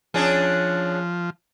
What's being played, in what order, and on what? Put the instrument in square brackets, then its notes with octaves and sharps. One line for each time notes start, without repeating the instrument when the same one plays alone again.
[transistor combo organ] F3 [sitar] C#4 D4 G#4